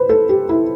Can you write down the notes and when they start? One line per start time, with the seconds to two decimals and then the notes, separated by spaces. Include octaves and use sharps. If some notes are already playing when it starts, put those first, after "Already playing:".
Already playing: B4 C5
0.09 A4
0.29 G4
0.49 E4